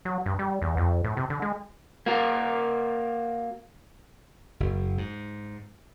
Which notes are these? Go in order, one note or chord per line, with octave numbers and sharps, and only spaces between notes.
F#3
G2
G3
E2
F2
A2
C3
D3
G#3
A#3 F#4 A#4
F#1
G#2